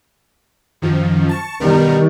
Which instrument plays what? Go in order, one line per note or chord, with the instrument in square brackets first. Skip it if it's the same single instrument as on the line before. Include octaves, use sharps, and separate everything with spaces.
[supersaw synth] F#2 D#3 F3
A5 C#6
[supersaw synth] B2 B3 A#4 [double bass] D#3 G3